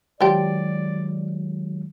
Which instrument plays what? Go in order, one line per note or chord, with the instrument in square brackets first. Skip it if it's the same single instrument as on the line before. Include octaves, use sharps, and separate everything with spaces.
[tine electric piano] D#3 F#3 G#3 [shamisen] F3 G4 [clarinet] D5